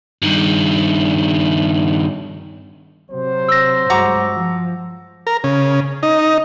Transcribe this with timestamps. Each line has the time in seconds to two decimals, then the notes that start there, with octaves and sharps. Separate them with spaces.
0.22 G2 D#3
3.11 C3 F#3 C5
3.48 E6 A#6
3.90 G2 G#3 F#4 A#5 D6
4.32 F3
5.27 A#4
5.44 C#3
6.03 D#4